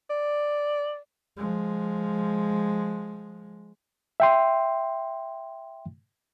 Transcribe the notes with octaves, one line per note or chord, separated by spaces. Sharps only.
D5
F3 G#3
E5 G5 C6